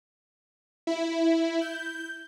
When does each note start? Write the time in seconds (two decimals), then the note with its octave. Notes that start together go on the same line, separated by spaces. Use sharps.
0.87 E4
1.61 G6